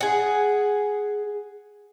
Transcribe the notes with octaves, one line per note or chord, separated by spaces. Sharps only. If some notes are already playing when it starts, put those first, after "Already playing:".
G#4 F#5